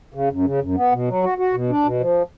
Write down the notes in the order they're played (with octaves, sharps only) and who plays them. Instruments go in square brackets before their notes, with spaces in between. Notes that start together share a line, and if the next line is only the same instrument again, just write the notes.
[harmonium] C#3
F#2
C#3
F#2
B3
B2
F#3
F#4
F#4
B2
D4
B2
F3